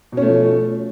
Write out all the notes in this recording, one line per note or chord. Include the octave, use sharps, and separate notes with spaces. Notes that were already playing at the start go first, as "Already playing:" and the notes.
B2 F3 A3 C#4